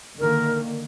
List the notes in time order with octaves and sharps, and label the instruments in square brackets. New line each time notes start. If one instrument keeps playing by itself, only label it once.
[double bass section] D3 D#3 A#3 [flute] A#4